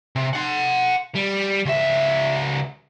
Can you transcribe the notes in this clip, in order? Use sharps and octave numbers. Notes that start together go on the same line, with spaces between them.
C3
F#5 C6
G3
C#2 E5